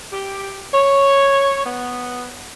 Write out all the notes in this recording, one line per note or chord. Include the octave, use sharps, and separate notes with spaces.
G4
C#5
B3